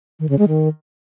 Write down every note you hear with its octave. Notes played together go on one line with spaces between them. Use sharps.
D#3
C#3
G#3
D#3